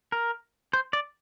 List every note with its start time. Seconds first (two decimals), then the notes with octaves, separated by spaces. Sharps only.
0.12 A#4
0.73 C5
0.93 D5